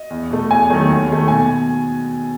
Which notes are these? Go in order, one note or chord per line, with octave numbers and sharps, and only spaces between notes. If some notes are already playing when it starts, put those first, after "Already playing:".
Already playing: D#5
E2
B2 A3
E2 G#5
D#3 F#3 A3
D#2
D#3 A3
B2 G#5